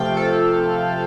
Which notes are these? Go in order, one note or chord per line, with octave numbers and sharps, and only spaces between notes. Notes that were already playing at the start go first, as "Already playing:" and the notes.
Already playing: C3 F3 A3 F5 G5
A4